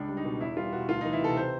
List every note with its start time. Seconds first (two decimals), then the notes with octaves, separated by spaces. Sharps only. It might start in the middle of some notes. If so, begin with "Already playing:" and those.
Already playing: C#2 D4
0.09 G3
0.17 D#4
0.25 B2
0.41 E2 E4
0.57 G3 F4
0.72 B2 F#4
0.89 D2 F4
1.01 D#4
1.05 E3
1.13 E4
1.21 C3 A4
1.37 C5